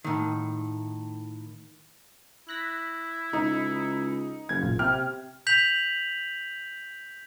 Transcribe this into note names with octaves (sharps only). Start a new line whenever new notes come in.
A2 D#3
E4 F#6 A#6 B6
C#2 D#4
F#1 G#6
A1 A#2 F4
C3 C4 G4 G5 F6
G6 B6 F7 F#7